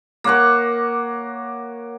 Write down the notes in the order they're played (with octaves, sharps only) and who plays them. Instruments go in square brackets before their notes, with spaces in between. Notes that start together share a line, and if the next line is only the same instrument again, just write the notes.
[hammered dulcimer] A#3 C#5 F#5 C#6